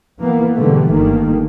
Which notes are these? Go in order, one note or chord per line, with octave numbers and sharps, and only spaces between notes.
E3 A#3 B3
G#2 B2 D3 E3 G3 A3
G1 G2 D#3 A3 A#3